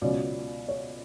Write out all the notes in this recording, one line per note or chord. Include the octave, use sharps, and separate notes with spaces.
C#2 B2 F#3 C#4 D5
C#5